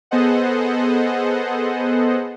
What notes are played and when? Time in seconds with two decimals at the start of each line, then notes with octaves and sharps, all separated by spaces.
0.11 B3 G#4 A4 C5 D#5 F#5